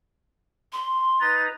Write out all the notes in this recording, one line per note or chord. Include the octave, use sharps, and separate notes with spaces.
C6
D#4 B4 A#5 A6